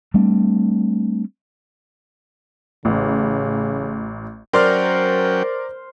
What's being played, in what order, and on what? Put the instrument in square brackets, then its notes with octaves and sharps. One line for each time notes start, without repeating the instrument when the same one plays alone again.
[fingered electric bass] G3 A3 C4 D4
[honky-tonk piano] A1 [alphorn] C#3
[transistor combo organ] F#3 C#4 G5 [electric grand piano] A#4 D5 F6 [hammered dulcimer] C5